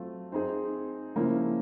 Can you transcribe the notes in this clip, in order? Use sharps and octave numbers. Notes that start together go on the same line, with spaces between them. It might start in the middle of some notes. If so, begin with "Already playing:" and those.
Already playing: F#3 A3 C4 F4
C4 D#4 G#4
C#3 F3 A#3 C#4 E4